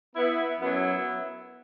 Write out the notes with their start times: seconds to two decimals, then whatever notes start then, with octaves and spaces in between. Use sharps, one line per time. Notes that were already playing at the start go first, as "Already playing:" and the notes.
0.15 B3 E4
0.60 F#2 F#3 B3 E4